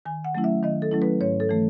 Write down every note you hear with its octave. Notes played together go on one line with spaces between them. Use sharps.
D#3 G#5
F#5
F#3 A3 C#4 E4
E5
D#3 D#5
A4
F#3 A3 C#4 E4
B4
G#2 C#5
A4
E3 A3